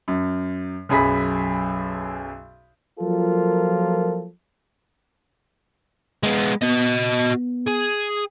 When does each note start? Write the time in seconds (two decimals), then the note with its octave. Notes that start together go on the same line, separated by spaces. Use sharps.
0.08 F#2
0.89 B1 F#2 G#4 B5 B6
3.00 F3 F#3 A#3 F4 A4 A#4
6.23 G#3 B3
6.62 B3 F#4 D#5
7.12 B3
7.68 G#4